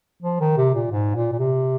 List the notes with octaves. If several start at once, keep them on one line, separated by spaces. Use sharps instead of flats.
F3
D#3
C3
A#2
G#2
A#2
A#2
C3